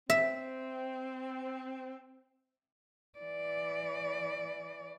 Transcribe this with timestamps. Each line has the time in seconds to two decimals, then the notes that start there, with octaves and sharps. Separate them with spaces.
0.10 C4 E5
3.19 E3 D5